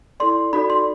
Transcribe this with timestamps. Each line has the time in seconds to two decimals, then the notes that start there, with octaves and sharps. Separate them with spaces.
0.20 E4 A4 D5 C6
0.53 D#4 F#4 A4 D5 B5
0.70 C6